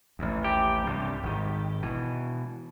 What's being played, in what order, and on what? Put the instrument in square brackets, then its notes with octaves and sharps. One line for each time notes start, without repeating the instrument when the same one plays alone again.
[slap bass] A1 D#2
[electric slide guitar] G4
[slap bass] C2 G2
G#1 D#3
B2 E3